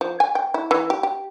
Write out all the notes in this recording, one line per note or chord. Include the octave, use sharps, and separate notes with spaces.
F3
G#5
G5
E4
E3
G4
G4